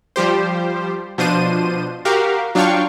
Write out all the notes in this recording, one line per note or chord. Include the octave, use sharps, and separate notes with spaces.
F3 G3 G4 C5
B2 F3 D4 C5 D#7
F#4 G4 A#4 F5
F#3 D4 F4 F5 G5 C#6